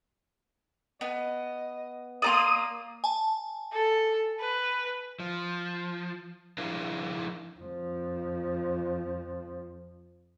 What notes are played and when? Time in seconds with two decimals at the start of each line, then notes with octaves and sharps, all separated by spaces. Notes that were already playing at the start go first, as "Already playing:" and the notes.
1.01 B3 D#5
2.22 A#3 D5 A#5 C6 D#6
3.04 G#5 A5
3.73 A4
4.40 B4
5.20 F3
6.58 F3 D4 E4 G#4 A#4 F5
7.60 F2 F3